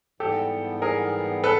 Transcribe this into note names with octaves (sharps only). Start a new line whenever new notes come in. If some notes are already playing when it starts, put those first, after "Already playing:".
G#2 E3 G3 B3 G4 A4
G#4 A#4
A4 B4